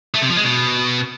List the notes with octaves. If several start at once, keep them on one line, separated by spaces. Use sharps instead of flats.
A3
C3
F3
G#3
B2